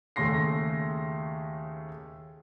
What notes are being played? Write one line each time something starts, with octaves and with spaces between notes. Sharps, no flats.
D#2 C#3 A3 C6 A#6 C7